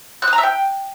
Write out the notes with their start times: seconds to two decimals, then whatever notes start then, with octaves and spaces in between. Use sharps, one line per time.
0.22 F#6
0.27 D#6
0.33 A#5
0.38 E5
0.43 G5